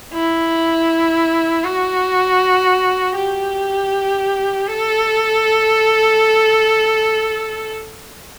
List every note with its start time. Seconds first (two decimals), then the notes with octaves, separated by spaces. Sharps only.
0.14 E4
1.64 F#4
3.16 G4
4.67 A4